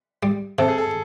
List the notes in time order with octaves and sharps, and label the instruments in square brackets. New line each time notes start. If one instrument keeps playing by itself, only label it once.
[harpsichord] G3
[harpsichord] C3 [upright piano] A4
[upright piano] G#4
A4